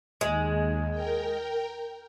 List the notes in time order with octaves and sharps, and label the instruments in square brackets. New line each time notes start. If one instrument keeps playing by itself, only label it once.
[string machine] D#2 [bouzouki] G#3
[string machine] A#4 G5